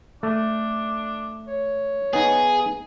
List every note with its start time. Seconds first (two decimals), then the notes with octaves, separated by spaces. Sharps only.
0.23 A3 D4
1.48 C#5
2.13 B3 D#4 G#4